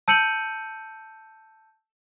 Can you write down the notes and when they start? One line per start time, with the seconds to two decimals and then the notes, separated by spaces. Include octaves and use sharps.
0.08 A5 E6 G6 C#7 D#7 F#7